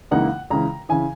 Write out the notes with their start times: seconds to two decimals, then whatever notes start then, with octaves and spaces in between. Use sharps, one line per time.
0.11 C#2 C#3 E3 A#3 D#4 F#5
0.50 C#2 C#3 E3 A#5
0.89 C#3 E3 G#5